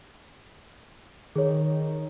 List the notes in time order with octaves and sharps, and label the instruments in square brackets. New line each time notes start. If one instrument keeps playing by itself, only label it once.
[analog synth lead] D#3 [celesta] G#4 C#5